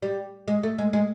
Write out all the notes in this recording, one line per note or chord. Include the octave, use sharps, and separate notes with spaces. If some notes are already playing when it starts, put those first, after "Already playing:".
G3
G#3
A3
G#3
G#3